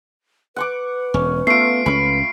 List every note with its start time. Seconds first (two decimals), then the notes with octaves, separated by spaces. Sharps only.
0.56 B4 F#5 C#6 D6
1.14 E1 C#4
1.47 A3 B3 F4 C7 D7
1.86 C#2 A3 C#4 B5 C#6